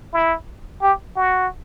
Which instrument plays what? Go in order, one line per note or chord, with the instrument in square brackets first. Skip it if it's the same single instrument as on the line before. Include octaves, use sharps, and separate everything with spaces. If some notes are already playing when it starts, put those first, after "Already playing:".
[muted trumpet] E4
G4
F#4